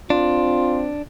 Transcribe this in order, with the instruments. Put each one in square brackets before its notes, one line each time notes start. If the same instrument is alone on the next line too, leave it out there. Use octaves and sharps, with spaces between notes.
[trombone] C4 [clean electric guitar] D4 [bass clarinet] F4